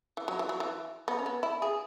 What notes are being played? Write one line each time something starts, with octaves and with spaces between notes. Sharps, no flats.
E3
F#3
E3
F#3
E3
B3
C#4
B3
E4
G#4